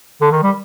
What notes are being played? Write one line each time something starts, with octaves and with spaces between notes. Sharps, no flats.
D3
D#3
G3